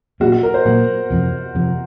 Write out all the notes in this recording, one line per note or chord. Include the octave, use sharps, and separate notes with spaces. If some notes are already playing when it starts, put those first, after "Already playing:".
A#2 F#3 A#3 F#4
F#4
A#4
C5
A#2 F#3 A#3 F#5
F2 C3 F3
F2 C3 F3